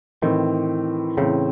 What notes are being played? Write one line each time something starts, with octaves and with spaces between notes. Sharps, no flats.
A2 D#3 E3 C4
A2 C#3 E3 C4